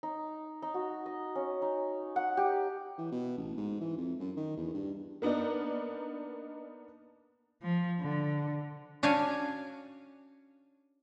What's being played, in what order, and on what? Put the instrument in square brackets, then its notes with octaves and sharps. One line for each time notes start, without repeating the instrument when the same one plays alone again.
[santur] D#4
D#4
F#4
D#5
C#4
D#4
F#5
G4
[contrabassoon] E3
B2
A1
G#2
E3
F2
F#2
D#3
E2
G2
[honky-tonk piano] A#3 B3 D4 D#4 A#4
[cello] F3
D3
[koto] C#4 D4 F#4 C#5 F5 G#5